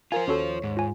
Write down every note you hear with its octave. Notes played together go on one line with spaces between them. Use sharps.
F4 A#4 C5 F5 G#5
D#2 C#4 F#4 A4 C#5
G#2
F4 G#5